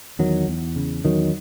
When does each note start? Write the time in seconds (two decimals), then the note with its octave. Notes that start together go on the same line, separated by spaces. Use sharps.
0.19 E2 D#3 F#3
0.48 E2
0.76 C#3
1.05 E2 D#3 F#3